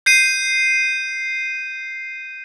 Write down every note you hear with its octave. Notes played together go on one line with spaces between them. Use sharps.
G6 C7 D#7